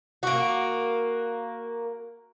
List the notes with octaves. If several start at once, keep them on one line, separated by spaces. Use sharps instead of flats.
A#3 F#4